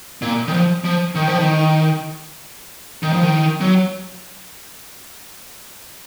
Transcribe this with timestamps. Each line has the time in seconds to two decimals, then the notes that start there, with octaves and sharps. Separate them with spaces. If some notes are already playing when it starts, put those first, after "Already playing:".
0.22 A#2
0.48 D#3
0.53 F3
0.84 F3
1.15 D#3
1.28 F3
1.39 D#3
3.03 D#3
3.13 F3
3.23 D#3
3.61 F#3